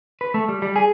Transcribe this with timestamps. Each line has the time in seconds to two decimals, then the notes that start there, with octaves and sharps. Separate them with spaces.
0.21 B4
0.34 A3
0.49 G3
0.62 G3
0.76 G#4